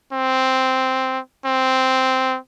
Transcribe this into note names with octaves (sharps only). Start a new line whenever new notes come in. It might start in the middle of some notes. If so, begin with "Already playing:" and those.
C4
C4